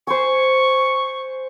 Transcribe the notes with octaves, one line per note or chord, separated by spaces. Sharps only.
C5 G#5 C#6